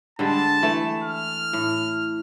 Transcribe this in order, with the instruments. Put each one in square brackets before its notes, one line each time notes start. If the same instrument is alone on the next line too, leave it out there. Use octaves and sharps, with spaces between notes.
[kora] D3 G3 G#3 [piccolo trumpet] A5
[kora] E3 A3
[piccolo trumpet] F6
[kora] A2